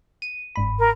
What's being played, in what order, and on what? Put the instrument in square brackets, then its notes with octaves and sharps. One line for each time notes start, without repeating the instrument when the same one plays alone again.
[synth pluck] D#7
G1 G#2 B5
[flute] A#4